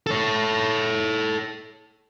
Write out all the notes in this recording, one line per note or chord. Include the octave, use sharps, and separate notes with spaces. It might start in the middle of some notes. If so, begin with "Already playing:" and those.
A4 C#5